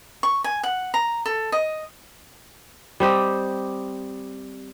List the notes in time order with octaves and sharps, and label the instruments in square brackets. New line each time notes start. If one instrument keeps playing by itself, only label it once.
[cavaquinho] C#6
G#5
F#5
A#5
A4
D#5
[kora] G3 C4 G4 D#5